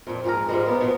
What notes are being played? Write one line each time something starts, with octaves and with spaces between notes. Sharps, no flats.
F2 A#2
F2 G#2 G4 G#4 A#4
G#2 F3 G3 G#3
A#3 B3
B2 D#3 F3